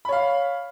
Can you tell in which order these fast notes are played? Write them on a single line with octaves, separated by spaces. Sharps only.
B5 C#5 F5